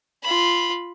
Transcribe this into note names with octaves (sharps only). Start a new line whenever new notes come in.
F4 B5